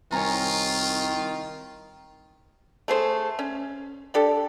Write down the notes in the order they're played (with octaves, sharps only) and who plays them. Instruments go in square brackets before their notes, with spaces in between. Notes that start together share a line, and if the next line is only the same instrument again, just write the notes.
[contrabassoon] C2 [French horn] D#3 [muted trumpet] F4 [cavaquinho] C#5 G#5 A#5
[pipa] A3 G#4 C5
C#4
D4 G4 A4